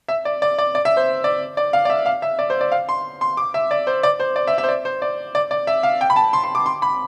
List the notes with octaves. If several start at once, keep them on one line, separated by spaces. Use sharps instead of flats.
E5
D5
D5
D5
D5
E5
C5
D5
D5
F5
D5
E5
F5
E5
D5
C5
D5
F5
C6
C6
D6
E5
D5
C5
D5
C5
D5
E5
E5
C5
D5
C5
D5
D5
D5
E5
F5
G5
B5
A5
C6
C6
D6
C6
B5